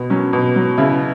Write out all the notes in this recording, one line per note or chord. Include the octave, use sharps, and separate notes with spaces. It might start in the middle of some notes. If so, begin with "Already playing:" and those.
Already playing: B2
F#3 C#4
B2
F#3
C#3 E4